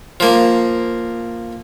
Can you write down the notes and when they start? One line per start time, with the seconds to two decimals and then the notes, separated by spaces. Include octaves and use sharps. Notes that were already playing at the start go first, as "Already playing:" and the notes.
0.20 F3 A#3